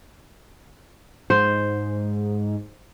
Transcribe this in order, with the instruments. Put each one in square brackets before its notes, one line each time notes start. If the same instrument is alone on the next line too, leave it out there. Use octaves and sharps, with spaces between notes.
[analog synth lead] G#2 [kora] C5